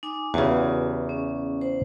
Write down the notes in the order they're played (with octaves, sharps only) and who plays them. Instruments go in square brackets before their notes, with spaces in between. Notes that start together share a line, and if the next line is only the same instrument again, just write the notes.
[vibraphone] D#4 G#5 D6
[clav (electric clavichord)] E2 C#3 [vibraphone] F#4 G4 B4
[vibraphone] C#4
C5